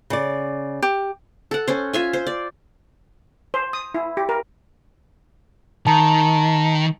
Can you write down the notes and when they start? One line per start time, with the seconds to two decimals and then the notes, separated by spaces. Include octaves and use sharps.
0.10 C#3 D5
0.82 G4
1.51 A4 F#5
1.68 C#4 C5
1.93 F4 E5 G#5
2.13 C5
2.27 D5
3.54 C5
3.73 D#6
3.94 E4
4.17 G4
4.29 A#4
5.87 D#3 A5 A#5